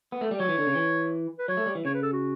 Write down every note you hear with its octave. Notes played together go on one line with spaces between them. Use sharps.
B3
A3
G3
F#3 C#5
E3
D3
C#3
E3
B4
F#3 C#5
A3
G3
E3
C#3 C#5
B4
A4
F#4